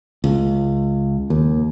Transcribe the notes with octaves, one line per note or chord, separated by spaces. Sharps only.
C#2
D#2